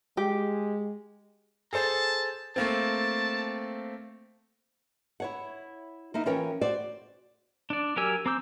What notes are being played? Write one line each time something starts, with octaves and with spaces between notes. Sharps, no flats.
G#3 G4
G#4 A4 C5 A5
A3 A#3 C4 A5
E4 C#5 F#5
A#3 D#4 E4
E3 F3 C#4 A#4 C#5 G5
F#4 C5 D5
D4 D5
F#3 G4 A#4 G#5 E6
C4 A#5 D6 E6 G6